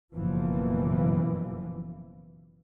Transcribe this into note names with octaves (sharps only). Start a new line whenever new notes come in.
F#1 B2 E3 F3